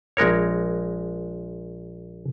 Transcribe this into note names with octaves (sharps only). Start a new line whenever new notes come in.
A#1 G#3 A#4 C#5